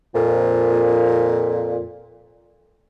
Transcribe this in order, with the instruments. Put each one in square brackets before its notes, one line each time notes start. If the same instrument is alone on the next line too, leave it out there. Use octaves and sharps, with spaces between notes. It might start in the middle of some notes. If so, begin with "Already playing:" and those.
[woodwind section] F2 A#2